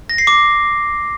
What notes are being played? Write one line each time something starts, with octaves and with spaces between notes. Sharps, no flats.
A#6
C7
D6